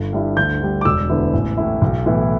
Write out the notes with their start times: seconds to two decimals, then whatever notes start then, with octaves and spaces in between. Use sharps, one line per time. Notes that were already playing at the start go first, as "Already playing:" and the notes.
Already playing: G1
0.13 G2 G3 E4
0.37 D2 G6
0.61 D3 G3
0.81 D6
0.85 E1 E6
1.09 D2 D3 B3 E4
1.33 A1
1.57 A2 A3 E4
1.82 B1
2.06 A2 E3 B3 E4